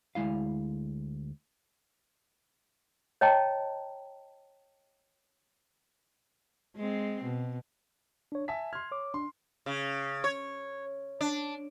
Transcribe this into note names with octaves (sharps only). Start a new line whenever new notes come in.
D2 G#3 E4 F5
C#5 D#5 G5 A5 A#5
G#3 C4
B2
D4 C#5
E5 G#5 A5 B6
C6 F6 G#6
C#5 D6
D4 C6
C#3
C#5
D4